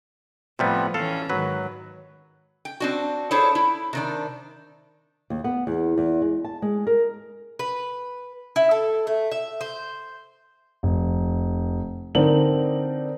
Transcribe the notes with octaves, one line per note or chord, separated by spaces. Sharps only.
A2 C3 F3 G3 B3
E3 C#4 A4 F5
G#2 D#3 F#3 B4
G5
C4 D4 F#4
D4 E4 G#4 A4 C5 C#5
E4
C3 D#3 D4
D#2
B3
E2
E2
G#3
A5
G#3
A#4
B4
E4
A4
A3
E5
C5
F1
D3 C4 D#4 A#4 D5 F#7